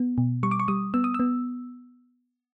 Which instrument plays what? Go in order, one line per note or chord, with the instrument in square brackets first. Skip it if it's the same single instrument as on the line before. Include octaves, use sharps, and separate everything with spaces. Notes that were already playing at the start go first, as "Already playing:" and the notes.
Already playing: [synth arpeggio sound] B3
B2
G3 C#6
D6
C#6
G3 D#6
B3 E6
D#6
E6
B3